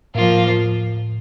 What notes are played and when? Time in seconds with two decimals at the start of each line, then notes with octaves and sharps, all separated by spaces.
0.15 A2 F3 A#3 F4